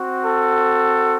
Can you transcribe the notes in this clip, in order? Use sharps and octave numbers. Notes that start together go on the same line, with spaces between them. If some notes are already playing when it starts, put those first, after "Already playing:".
Already playing: C4 F#4
A4